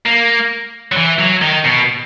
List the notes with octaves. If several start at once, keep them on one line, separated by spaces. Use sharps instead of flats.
A#3
F#3
E3
F#3
D#3
B2